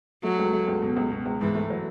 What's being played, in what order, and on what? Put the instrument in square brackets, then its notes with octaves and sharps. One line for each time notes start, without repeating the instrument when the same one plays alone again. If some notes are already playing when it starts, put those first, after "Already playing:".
[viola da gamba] F#3 [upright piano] A3
[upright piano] C#2
A3
C#2
B2
C#2
B2
C#2
[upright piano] G#2 [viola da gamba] E3
[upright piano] A3
F#3